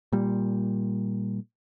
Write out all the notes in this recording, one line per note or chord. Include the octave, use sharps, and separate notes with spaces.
A#2 G3